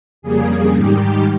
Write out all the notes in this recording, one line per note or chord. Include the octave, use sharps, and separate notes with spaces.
F2 C#3 G3 A#3 G#4
G#2 D#3 G3 G4